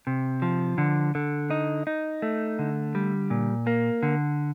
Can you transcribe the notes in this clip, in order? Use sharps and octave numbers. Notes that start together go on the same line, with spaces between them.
C3
F3
D3
D3
D#4
D#4
A3
D3
G3
A#2
A#3
D3